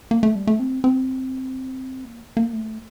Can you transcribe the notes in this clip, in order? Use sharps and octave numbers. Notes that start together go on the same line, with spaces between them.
A#3
A3
G3
A3
C4
C4
A#3
A#3
A3